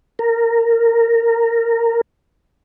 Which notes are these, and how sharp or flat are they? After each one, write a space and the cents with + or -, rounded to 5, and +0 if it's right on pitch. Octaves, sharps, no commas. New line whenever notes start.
A#4 -15